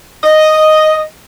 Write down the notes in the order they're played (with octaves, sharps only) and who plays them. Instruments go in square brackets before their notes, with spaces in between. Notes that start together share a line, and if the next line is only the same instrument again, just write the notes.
[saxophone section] D#5